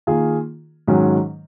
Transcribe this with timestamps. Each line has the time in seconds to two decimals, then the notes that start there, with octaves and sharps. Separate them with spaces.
0.07 D#3 A#3 F4 G#4
0.88 G#2 D#3 F#3 C#4